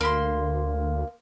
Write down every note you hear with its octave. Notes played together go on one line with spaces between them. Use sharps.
D2 A#3 B5 C6